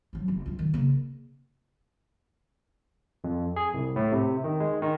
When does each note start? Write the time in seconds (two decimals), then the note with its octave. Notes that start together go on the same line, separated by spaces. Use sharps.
0.13 F3 F#3
0.28 F#1
0.46 C#2 F4
0.59 D#3
0.74 C#3 A#3
3.24 F2
3.56 G#4
3.74 C2
3.96 A2
4.12 C3
4.44 D#3
4.60 G#3
4.82 D#3